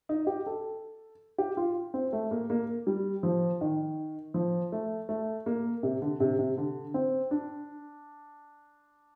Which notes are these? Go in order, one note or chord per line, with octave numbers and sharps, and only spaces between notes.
D#4
G4
A4
G4
F4
C4
A3
A#3
A#3
G3
F3
D#3
F3
A3
A3
A#3
C3
D3
C3
C3
D3
C4
D4